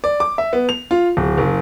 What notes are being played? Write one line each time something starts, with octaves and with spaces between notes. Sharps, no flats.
D5
D6
E5
B3
F7
F4
D1
F#1